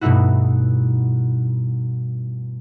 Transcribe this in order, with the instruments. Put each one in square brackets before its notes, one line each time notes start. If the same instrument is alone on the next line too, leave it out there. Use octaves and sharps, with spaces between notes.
[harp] G2 B2 A3 D#4 E4 F#4